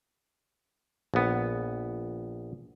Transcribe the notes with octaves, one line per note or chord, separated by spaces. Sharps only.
A#1 B3